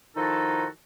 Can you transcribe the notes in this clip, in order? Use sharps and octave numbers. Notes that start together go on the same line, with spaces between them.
D#3 F3 D#4 E4 F#4 A4